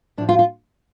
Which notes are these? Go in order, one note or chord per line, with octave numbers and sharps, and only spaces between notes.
A2 F3 D4
F4
F4